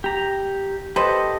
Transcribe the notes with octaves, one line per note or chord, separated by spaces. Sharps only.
G4 A#5
G4 A4 B4 C5 D#5